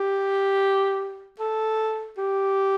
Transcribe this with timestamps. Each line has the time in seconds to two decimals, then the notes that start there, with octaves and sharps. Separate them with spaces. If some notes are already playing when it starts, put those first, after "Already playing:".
Already playing: G4
1.39 A4
2.18 G4